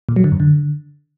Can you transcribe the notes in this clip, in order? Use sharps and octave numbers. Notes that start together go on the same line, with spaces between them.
A#2
F#3
D3
F#2
D3